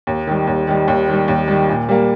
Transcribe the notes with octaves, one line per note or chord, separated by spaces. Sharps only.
D#2
D#3 G3
D#2
D#3 G3
D#2
D#3 G3
D#2
D#3 G3
A#2
G3 A#3